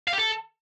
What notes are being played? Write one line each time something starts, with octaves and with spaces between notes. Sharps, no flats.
F5
G4
A4